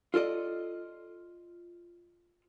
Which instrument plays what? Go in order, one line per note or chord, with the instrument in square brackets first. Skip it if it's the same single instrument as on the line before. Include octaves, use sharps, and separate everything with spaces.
[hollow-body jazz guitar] F4 A4 D5 D#5